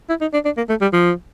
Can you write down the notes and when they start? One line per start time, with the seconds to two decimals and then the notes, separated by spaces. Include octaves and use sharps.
0.09 E4
0.21 D#4
0.33 D4
0.45 D4
0.57 A#3
0.69 A3
0.81 G3
0.93 F3